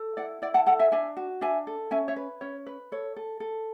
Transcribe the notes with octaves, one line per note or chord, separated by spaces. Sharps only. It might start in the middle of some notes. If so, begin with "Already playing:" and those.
Already playing: A4
E4 D5 F#5
E4 D5 F#5
F#5 A5
A4 F#5 A5
E5 G#5
D4 E5 G#5
F#4
D4 E5 G#5
A4
C#4 E5 G#5
C#5 E5
B4
C#4 C#5
B4
A4 C#5
A4
A4